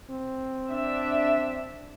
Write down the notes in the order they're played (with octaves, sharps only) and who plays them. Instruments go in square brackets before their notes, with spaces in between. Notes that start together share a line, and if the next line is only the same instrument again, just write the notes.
[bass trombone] C4
[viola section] D4 E5